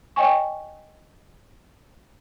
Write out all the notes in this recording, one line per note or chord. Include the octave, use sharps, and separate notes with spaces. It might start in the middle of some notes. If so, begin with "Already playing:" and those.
C#5 D#5 G5 G#5 C#6